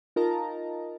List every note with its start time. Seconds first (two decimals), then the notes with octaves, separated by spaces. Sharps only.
0.16 D#4 F4 A#4 D#5 A5 A#5